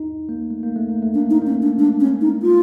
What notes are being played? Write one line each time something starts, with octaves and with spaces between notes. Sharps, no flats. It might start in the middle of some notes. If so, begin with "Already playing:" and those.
Already playing: D#4
A#3
A3
A#3
A3
A#3
A3
A#3 D4
A3 D#4
A#3 C#4
A3
D4
G#3 D4
C#4
D#4
F4